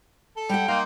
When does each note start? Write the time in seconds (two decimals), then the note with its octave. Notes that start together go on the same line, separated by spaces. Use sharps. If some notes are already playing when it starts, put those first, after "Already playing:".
0.36 A4
0.49 G3 F#5 G5
0.68 A#3 D#4 F5 C6